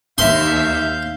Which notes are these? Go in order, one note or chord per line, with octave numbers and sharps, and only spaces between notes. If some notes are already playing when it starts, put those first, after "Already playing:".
D#2 E5 F5 C6 G6